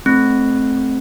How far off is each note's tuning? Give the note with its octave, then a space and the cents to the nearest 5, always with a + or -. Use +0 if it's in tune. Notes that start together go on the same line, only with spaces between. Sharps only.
A3 -20 C4 +0